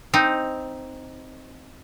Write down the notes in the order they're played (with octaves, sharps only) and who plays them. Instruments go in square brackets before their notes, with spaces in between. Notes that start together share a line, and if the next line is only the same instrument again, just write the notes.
[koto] C4 D#4